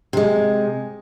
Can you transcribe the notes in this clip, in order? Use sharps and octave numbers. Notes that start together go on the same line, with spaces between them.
C3 G#3